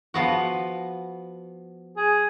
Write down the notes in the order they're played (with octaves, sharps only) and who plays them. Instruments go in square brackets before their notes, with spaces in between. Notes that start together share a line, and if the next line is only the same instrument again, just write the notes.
[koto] F3 B3 F#4
[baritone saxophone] G#4